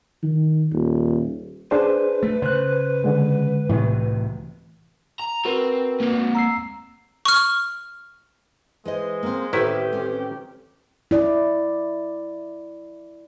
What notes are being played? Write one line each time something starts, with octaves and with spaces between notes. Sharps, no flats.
D#3
D#1
D4 G#4 B4 C5
A3
C#3 C5 F#6
D3 G#3
C2 A2 C3 E3
A#5
C4 F#4 A#4 B4
A#3 C4
A#5 E6 C7
C#6 F6
E3 G#3 C5 D#5
A#3 C4
A1 D#3 E4 G4 B4 C5 E5
C4 C#4
E4 D5